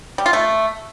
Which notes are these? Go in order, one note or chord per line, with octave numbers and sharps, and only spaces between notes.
G3
F4
A3